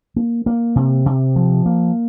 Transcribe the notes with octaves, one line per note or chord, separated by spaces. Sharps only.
A#3
A#3
C3
C3
F3
A#3